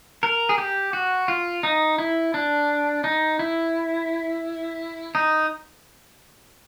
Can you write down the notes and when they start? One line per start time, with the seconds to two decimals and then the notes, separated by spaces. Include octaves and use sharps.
0.23 A#4
0.49 G#4
0.58 G4
0.93 F#4
1.28 F4
1.63 D#4
1.98 E4
2.34 D4
3.04 D#4
3.39 E4
5.15 D#4